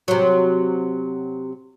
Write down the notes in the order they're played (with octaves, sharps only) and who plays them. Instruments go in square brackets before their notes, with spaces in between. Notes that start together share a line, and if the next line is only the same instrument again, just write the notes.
[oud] C3 F#3